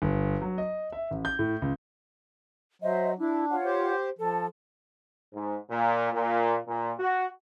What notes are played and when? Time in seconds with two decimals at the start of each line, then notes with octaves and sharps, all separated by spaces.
0.02 G1
0.42 F#3
0.58 D#5
0.92 E5
1.11 A1
1.25 G6
1.39 A2
1.62 C#2
2.82 F#3 C5 D#5 E5
3.19 D4 E4
3.50 F4 C#5 F#5
3.65 G4 C5
4.19 F3 A4
5.34 G#2
5.70 A#2
6.13 A#2
6.67 A#2
6.99 F#4